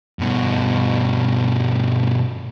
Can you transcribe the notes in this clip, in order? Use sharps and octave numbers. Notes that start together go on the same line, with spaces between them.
G2 B2